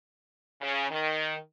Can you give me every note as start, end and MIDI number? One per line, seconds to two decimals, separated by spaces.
0.61 0.86 49
0.90 1.36 51